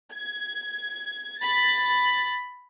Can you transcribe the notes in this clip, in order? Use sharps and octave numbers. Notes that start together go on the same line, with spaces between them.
G#6
B5 A6